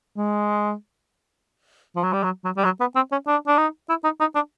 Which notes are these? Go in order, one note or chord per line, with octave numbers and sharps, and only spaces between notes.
G#3
F3
F#3
G3
F#3
F#3
G3
F#3
B3
C4
C#4
D4
D4
D#4
E4
D#4
D#4
D4